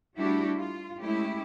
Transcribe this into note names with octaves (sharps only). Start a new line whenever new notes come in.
G3 A3 D4 E4 F#4 G4
F4
G#3 A3 C#4 E4 G4